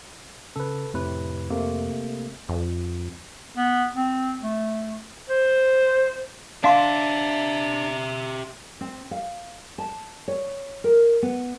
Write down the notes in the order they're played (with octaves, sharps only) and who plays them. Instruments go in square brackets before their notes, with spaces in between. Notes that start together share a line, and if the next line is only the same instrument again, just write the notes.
[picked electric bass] C#3 C#4 [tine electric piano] A4 B4
[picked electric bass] F2 [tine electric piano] A2 C3 B4
[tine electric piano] C3 A3 A#3
[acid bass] F2
[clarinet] B3
C4
A3
C5
[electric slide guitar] D4 [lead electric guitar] G4 E5 [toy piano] F5 C6 D6
[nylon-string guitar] C4
F5
A5
C#5
A#4
B3